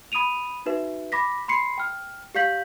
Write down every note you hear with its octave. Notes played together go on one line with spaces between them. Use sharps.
B5 D#6 D7 D#7 F7
D#4 F#4 B4 E5
B5 D6 A#6 B6
B5 C6 C7 C#7
G5 F6
G4 D5 F5 G6 B6 F#7